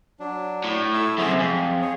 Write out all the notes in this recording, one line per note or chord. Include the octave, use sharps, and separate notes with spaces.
F#3 D4
A2
A3 E4 E6
F#2 C3 G#4 C5 E5
F2 G#3
G#4 C#5